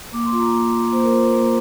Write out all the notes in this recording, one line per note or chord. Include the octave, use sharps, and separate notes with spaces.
A#3 D6
C6
F4
A#5
A#3
F4
A#3 C5
A#4
F4 C5
A#3